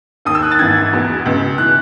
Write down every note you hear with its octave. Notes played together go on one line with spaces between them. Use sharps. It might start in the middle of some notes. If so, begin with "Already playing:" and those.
D#2 D#3 D#6
E6
F#6
A6
G#1 G#2 E3 G#6
E1 E2 B2
C#2 B2
E3 F#6